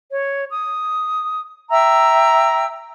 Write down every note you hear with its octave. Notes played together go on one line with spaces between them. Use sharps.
C#5
D#6
E5 G5 A#5 E6